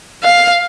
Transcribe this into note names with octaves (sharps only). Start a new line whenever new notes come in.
F5